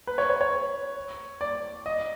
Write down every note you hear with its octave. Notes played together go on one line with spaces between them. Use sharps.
B4
C#5
C#5
C#5
D5
D#5